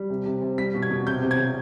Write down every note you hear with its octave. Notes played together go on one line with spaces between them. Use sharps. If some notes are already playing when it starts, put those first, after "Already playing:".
Already playing: G3
C3
C3
C3
G3 B6
B2
G#6
B2
C3 G6
C3
G#6
C3